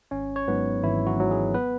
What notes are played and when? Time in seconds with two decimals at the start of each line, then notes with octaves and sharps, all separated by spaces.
0.11 G#1 C#4 C#5
0.36 C#5
0.48 G#2 F#3 B3 B4
0.83 G#1 E3 E4
1.07 F#3 F#4
1.18 G#2 F#3
1.30 G#3 G#4
1.54 B3 B4